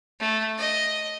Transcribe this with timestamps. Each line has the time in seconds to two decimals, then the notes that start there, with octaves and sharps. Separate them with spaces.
0.20 A3
0.58 D#5